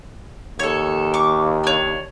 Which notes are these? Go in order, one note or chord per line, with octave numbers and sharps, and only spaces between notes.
D#2 A4 C#5
C#6 D6
D4 C#5